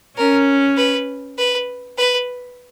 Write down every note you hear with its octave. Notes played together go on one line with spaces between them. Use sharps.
C#4 A#4
B4
B4
B4